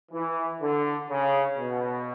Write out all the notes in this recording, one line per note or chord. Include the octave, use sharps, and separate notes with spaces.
E3
D3
C#3
B2